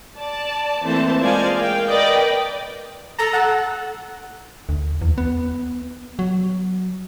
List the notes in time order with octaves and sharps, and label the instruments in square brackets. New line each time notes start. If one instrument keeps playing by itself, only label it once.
[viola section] D5 A5
E3 A3 A#3 C4 C5 A5
G#3 F4 C5 D5 F5 G#5
A#4 F5 G5
A#4 B4 D5 D#5 G5
[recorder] A4 [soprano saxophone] A#5
[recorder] A4 [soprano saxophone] F#5
[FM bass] D2
E2
B3
F#3